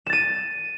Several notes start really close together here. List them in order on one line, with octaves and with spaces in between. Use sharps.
E7 A6 D#7